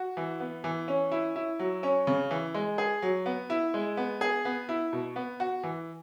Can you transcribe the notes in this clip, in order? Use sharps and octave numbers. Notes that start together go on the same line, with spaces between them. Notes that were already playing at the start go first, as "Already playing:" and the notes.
Already playing: F#4
E3
B3
E3
C#4
E4
E4
F#3
C#4
C#3
E3
G#3
G#4
F#3
B3
E4
G#3
B3
G#4
B3
E4
B2
B3
F#4
E3